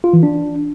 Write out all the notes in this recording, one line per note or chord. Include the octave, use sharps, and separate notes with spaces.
F4
E3
D4